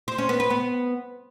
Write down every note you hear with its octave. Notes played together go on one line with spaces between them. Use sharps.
C5
C#4
B3
B4
B3